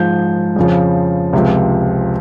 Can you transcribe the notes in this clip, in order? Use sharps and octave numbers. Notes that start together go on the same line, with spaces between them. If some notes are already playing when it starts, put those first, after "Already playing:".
Already playing: G#2 F3 G6
F2 C#3 F3
C#2 C3 F3